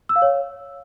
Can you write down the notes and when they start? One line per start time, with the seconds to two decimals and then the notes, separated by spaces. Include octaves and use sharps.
0.09 E6
0.16 F5
0.22 C#5